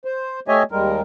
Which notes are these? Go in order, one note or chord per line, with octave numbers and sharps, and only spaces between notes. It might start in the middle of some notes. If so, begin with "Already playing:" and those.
C5
A3 G4 C#5 D#5 E5 G#5
D#2 G3 G#3 A#4